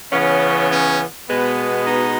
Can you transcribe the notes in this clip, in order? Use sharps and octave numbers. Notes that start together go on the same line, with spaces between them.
C#3 E3 B3 C#4
C#4
B2 G#3 B3
D#4 F#4